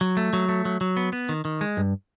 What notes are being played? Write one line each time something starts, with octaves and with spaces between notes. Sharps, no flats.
F#3
A3
F#3
A3
F#3
F#3
B3
B3
D#3
D#3
G#3
G2